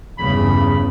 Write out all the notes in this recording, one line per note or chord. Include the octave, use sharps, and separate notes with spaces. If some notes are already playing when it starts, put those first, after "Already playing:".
E2 G2 C#3 B5